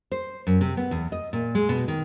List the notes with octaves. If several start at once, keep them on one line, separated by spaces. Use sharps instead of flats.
C5
F#2
C3
B3
E2
D#5
A#2
G#3
B2
D#3